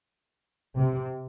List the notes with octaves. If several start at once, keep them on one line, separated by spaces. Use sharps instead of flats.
C3